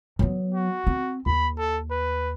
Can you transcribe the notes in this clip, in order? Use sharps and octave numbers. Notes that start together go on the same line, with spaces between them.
F#3 B3
F#4
C4
D#2 B5
A4
B4